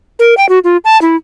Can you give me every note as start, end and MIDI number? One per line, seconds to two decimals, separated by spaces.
0.19 0.34 70
0.37 0.48 79
0.49 0.59 66
0.64 0.77 65
0.84 0.99 81
1.01 1.16 64